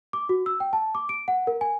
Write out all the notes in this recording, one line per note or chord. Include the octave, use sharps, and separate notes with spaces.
D6
F#4
E6
G5
A5
D6
D7
F#5
A#4
G#5